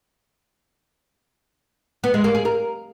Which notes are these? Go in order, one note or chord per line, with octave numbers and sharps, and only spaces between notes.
B3
G#3
A#3
G#4
A#4